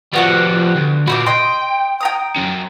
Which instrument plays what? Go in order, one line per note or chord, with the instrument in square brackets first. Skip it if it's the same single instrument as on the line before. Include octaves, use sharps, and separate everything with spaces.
[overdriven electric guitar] F3 G3 [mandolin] B3 F#4 F#5
[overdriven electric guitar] D2
[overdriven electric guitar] A#2 F#4 [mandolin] B5 C#6 D6
[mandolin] D#5 C6 [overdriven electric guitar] G5
[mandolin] G5 A#5 D#6
[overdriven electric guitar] F#3 C#4